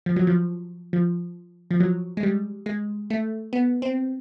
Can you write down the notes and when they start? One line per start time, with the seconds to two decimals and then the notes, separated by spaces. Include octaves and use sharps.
0.06 F3
0.16 F#3
0.27 F3
0.93 F3
1.71 F3
1.80 F#3
2.17 G#3
2.23 G3
2.66 G#3
3.10 A3
3.53 B3
3.82 C4